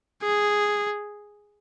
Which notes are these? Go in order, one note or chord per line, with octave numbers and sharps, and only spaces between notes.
G#4